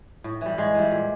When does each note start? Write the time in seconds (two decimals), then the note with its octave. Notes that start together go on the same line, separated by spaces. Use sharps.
0.24 A2
0.41 E3 G3
0.58 A2 G#3
0.74 E3 G3
0.91 A#2